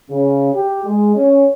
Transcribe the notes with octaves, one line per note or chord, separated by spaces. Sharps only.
C#3
G4
G#3
C#4